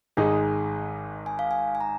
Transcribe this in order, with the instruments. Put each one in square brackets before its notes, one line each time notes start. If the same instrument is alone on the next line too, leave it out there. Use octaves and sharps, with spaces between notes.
[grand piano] G#1 G#2 G#3 D#4 [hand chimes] G#5
[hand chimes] G#5
F5
G#5
G#5
A#5